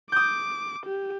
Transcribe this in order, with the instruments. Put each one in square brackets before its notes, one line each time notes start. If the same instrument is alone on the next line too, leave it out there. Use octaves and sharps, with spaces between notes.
[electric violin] D6 [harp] D#6 G6
[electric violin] G4